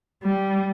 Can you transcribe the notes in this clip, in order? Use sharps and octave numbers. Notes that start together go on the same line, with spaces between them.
G3